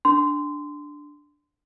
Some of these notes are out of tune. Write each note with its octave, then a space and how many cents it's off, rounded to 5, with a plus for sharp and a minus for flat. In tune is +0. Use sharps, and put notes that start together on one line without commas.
D4 +0 C6 -20